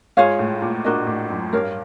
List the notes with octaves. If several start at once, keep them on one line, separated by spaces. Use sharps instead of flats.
G#2 F4 G#4 C#5 F5
A2
A#2
A#2 D4 F#4 A#4 D#5
A2
F#2
G2 A#4 C#5 F5